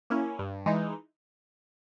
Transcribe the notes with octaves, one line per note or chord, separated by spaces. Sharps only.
A#3 C#4 E4
G2
E3 G#3 D#4